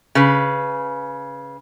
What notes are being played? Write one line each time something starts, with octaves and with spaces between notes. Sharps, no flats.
C#3 B4